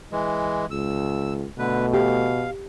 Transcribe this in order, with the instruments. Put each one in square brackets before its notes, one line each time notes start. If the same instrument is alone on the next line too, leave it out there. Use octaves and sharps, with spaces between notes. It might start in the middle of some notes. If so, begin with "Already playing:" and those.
[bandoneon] E3 G#3
[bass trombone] C#2 [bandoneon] E6
[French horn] B2 [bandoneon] D3 B4 [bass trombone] A3
[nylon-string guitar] G4 [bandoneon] F5